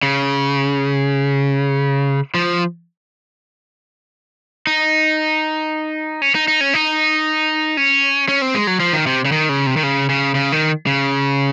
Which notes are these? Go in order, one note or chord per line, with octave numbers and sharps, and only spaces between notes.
C#3
F3
D#4
C#4
D#4
D#4
C#4
D#4
C#4
C#4
C4
G#3
F#3
F3
D#3
C3
C#3
D#3
C#3
C3
D#3
C#3
C#3
C#3
D#3
C#3